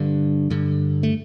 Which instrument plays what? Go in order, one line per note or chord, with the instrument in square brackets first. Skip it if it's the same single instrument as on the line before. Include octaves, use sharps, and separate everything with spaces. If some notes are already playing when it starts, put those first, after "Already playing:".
Already playing: [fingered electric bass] G2 D3
G2 D3
A3